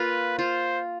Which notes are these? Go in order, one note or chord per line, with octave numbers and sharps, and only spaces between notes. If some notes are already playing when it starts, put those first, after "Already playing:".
Already playing: A#3 F4 B4
F4 C5